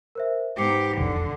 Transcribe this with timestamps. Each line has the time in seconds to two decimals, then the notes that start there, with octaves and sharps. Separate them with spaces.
0.15 A#4 C5 E5
0.58 G#2 B3 G4 A#5 D6 C7 C#7
0.97 E1 B1 F2 D3